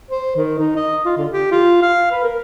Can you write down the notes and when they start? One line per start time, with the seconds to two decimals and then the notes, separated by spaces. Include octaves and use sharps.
0.11 C5
0.36 D#3
0.58 D#4
0.76 D#5
1.05 F4
1.17 D3
1.31 G4
1.51 F4
1.82 F5
2.12 B4
2.23 A#4